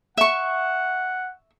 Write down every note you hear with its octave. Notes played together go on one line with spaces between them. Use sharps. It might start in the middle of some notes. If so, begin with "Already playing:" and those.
E5 F#5 C#6